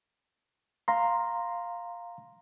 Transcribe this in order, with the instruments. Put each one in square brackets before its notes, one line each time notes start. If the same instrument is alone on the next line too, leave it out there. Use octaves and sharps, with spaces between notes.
[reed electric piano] F5 A#5 C6